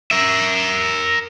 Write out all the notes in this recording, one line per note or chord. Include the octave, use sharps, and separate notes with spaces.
A#4 E5